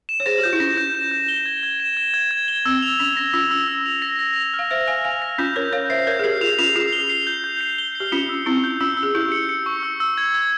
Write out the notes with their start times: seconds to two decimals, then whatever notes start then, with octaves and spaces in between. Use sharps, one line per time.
0.09 E7
0.20 C#5
0.26 G#4 C5 A#6
0.38 G4
0.43 F4 G6
0.53 E4
0.60 C#4 A#6
0.77 G6
0.95 E7
1.11 G6
1.28 G7
1.46 G#6
1.63 G#6
1.80 E7
1.97 G#6
2.14 G#6
2.31 G#6
2.48 G7
2.65 C4 E6
2.83 F7
2.99 C#4 F7
3.17 A#6
3.33 C#4 F4 E6
3.51 E6
3.68 E6
3.86 F7
4.02 A#6
4.19 A#6
4.36 F7
4.54 F6
4.59 F5
4.70 C5 E5 F6
4.88 F5 G#5 F6
5.04 F5 G#5 F7
5.22 A#6
5.38 C#4 F4 G6
5.56 A#4 C#5 G6
5.73 C#5 F5 G6
5.90 C5 E5 C7
6.07 A#4 C#5 G6
6.19 G#4
6.24 G4 A#4 C7
6.41 F4 G#4 F7
6.59 C#4 F4 F7
6.76 F4 G#4 C7
6.92 G7
7.09 C7
7.27 G6
7.44 G6
7.61 C7
7.78 G7
7.95 C7
8.00 G4
8.12 C#4 F4 C#7
8.29 E6
8.46 C4 E4 E6
8.64 G6
8.80 C#4 F4 E6
8.97 E6
9.03 G#4
9.15 E4 G4 G6
9.32 C#7
9.49 C#7
9.66 C#6
9.83 E6
10.00 E6
10.18 G#6
10.34 G#6